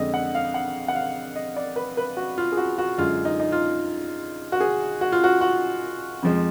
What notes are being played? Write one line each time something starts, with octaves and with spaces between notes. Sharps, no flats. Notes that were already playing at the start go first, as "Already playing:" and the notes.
Already playing: F2 D3 G#3 D#5
F#5
F5
F#5
F#5
F5
D#5
D5
B4
B4
F#4
F4
G#4
F#4
F#4
F#2 D3 G#3 F4
D#4
D#4
F4
F#4
G#4
F#4
F4
F#4
F#4
F2 F3 G#3